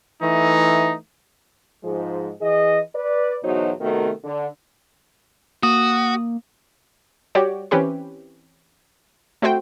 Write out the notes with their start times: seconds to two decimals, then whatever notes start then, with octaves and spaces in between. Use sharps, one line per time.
0.20 E3 A3 D#4
1.83 G#2 F3 G#3
2.41 E3 G#4 D#5
2.95 B4 D5
3.44 E2 B2 F#3 D#4 F#4 C5
3.81 C3 D#3 A3 B3 F#4 A#4
4.24 D3
5.63 A#3 F#4 D#6
7.35 G3 F#4 G4 C#5 D5
7.71 E3 C4 C#4 G4 B4
9.42 A3 C4 F#4 C5 G5